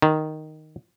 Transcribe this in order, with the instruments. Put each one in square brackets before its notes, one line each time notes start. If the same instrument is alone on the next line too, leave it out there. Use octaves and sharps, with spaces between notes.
[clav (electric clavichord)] D#3